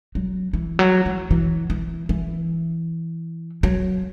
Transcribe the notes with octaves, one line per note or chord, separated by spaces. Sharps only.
F#3
E3
F#3
E3
E3
E3
E3
F#3